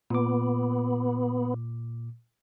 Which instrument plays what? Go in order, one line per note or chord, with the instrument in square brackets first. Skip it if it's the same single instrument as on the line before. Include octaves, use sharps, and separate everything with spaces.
[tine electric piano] A#2 D6 [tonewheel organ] B3